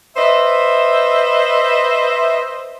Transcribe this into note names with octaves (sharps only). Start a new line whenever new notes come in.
B4 C5 D#5 E5